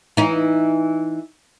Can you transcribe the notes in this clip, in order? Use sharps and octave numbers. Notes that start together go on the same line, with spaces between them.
E3 D#4